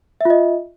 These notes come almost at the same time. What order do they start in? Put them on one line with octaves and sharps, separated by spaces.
E5 F4 D#5